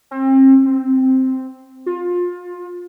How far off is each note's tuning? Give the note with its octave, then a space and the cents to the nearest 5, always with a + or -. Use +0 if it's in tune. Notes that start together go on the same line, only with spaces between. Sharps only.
C4 +35
C4 +0
F4 +25